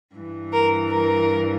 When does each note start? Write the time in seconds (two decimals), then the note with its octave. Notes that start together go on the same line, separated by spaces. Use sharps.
0.14 G2 E3
0.53 A#4
0.91 A#4